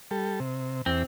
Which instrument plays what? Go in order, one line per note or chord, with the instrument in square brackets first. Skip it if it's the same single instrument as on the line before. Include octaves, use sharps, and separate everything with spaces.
[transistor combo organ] G3 A4
C3
[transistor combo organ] E2 [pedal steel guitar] C4